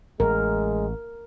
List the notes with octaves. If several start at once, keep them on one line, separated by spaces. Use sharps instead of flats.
A1 G#3 A#4